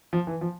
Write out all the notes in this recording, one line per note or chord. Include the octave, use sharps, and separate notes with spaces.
F3
E3
F3